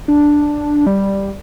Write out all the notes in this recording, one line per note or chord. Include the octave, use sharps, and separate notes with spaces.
D4
G3